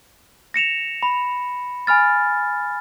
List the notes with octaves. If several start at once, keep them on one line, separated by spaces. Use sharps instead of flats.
A#6 C#7 E7 F7
B5
G#5 B5 F6 A6